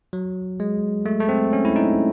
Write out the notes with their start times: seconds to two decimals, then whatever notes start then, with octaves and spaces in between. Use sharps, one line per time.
0.13 F#3
0.60 G#3
1.06 A3
1.20 A3
1.29 C4
1.53 C#4
1.65 E4
1.76 D#4